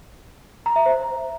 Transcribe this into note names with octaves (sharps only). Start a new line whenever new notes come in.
A#5
E5
C5